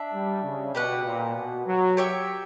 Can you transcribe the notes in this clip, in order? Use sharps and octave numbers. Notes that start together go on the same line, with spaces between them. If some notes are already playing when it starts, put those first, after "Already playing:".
Already playing: D4 E5
G3
C#3
B2 G4 B4 F#5
A#2
B2
F#3
G4 C#5 E5 G5